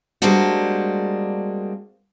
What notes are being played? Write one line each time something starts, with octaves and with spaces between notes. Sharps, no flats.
G3 G#3 A#3 C4 D4 F#4